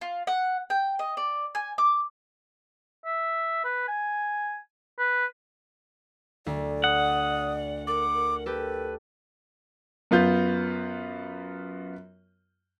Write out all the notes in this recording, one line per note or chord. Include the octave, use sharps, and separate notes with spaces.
F4
F#5
G5
D#5
D5
G#5
D6
E5
B4
G#5
B4
D2 D5
F#5 D#6
A#4 D6
A#4
G4 A4 B4
F#2 B3 F4 G6